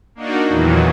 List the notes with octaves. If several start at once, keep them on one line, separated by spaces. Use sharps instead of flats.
A#3 D4 D#4 F#4
E2 A#2 D#3 E3 F#3